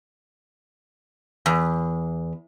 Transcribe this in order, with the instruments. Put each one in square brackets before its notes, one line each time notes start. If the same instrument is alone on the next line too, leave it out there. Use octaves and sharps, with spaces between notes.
[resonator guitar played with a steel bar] E2